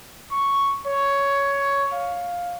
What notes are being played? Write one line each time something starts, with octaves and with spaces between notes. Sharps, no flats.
C#6
C#5
F5